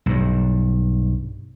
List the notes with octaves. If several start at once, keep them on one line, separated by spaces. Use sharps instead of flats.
B1 G2